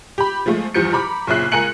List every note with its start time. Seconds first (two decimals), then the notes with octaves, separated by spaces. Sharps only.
0.18 G4 B5
0.46 F3 G#3 A3 F4
0.74 E2 G2 F3 G6 C#7
0.93 A#5 B5 D6
1.27 F#1 A#2 C#3 E5 F#6 C7
1.52 C#2 A#4 G#5 F#6 C#7 F#7